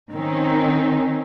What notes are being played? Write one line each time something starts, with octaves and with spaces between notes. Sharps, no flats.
D#3 C4 C#4 D#4